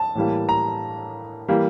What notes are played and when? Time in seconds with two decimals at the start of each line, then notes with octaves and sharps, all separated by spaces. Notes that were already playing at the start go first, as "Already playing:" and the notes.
Already playing: A5
0.15 A2 E3 G3 A#3
0.49 A#5
1.48 E3 G3 A#3